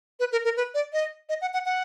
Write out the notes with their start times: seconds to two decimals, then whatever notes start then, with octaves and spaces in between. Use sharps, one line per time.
0.20 B4
0.32 A#4
0.45 A#4
0.57 B4
0.74 D5
0.93 D#5
1.29 D#5
1.41 F#5
1.54 F#5
1.66 F#5